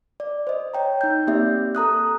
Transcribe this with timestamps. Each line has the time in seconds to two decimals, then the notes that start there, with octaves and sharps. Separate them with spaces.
0.20 D5
0.47 C5 D#5
0.74 C#5 G5 A#5
1.01 D#4 G6
1.27 A#3 C4 G4 D5 E5
1.75 A4 A#5 D#6 F#6